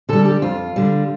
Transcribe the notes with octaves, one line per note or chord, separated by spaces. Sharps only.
D3 G3 A4
G4
F2 F4
D3 G3